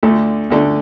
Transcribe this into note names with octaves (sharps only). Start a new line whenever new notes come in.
D2 D3 A3 D4
D2 D3 A3 D4